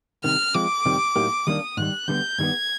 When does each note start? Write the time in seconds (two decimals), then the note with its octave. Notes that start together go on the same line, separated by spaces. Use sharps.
0.24 C2 C3 D#3 F6
0.55 F3 G#3 C4 D6
0.85 F2 C3 D#3 G3 C4
1.16 A2 F#3 A#3 D#4 G4
1.47 D#2 D#3 G3 A#3 D4 D#6
1.77 G#2 D#3 G3 F#6
2.08 D2 D3 G3 B3 G6
2.38 G2 D#3 G3 B3 G#6